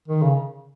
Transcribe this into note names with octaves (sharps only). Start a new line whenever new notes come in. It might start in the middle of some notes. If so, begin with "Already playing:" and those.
D#3
C#3